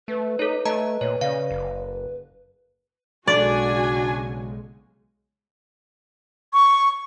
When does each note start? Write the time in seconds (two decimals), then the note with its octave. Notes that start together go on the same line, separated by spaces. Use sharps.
0.08 A3 B4
0.39 D#4 A4 C#5
0.65 A3 D#5 A5 A#5
1.01 A#2 C#5
1.21 C#3 D5 F5
1.51 F#1
3.27 B1 C#3 G#3 D4 F#4 D5 G#5
6.53 C#6